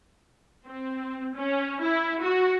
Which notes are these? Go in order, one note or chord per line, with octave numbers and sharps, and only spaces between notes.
C4
C#4
E4
F#4